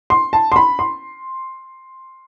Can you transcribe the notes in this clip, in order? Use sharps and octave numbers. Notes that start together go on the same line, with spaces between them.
C6
A5
C6
B5
C6